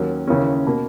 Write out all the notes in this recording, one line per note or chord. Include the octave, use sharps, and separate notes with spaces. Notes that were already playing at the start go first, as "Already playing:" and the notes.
Already playing: D#2 D#3 F#3 A#3 C#4
D#2 C#3 E3 A#3 C#4
B2 A#3